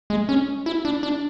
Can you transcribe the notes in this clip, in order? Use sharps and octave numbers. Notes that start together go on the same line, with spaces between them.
G#3
C#4
E4
D4
D4